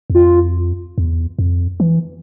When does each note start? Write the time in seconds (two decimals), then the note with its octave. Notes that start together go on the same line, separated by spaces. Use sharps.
0.10 E2
0.15 F2 F4
0.98 E2
1.39 F2
1.80 E3